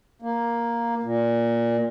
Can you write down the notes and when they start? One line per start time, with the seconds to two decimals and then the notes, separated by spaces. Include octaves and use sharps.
0.22 A#3
1.03 A#2